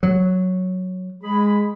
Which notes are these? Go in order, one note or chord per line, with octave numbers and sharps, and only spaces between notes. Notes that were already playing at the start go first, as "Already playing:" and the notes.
F#3
G#3 G#4 B5